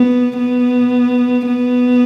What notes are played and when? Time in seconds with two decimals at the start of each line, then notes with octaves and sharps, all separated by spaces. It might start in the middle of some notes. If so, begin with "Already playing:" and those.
Already playing: B3
0.38 B3
1.47 B3